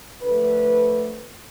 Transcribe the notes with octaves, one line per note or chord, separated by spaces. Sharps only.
D3 F3 A3 B4